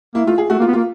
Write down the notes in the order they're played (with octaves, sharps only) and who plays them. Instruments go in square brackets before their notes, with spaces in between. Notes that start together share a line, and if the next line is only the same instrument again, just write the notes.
[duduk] A#3 [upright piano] E4
[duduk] A3 [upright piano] F4
[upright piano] G#4
[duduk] A3 [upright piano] F#4
[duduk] A#3
[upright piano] F4
[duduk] B3
[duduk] A#3 [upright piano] F4